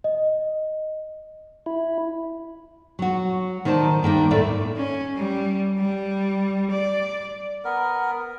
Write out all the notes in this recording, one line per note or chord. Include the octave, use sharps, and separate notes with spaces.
D#5
E4
F#3 F#4
D#3 D#4 C5 D5 A5
G2 D#3 A#3 D4
D#2 A2 D#3 A3 D5 E5
C#4
G3
G3
D5
B3 A#4